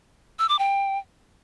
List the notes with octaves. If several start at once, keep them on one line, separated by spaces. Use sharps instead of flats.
E6
D6
G5